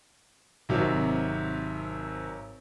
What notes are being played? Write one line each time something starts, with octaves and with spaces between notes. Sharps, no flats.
G#1 C3 F#3